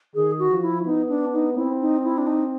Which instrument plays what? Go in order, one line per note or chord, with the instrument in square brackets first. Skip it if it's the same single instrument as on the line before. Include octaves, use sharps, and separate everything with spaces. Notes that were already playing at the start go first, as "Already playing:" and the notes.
[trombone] D#3 [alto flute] G#4
[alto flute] F#4
[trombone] F3
[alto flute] E4
[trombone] B3 [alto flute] D#4
[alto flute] D4
D#4
[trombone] C4 [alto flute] E4
[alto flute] D#4
E4
D4
D#4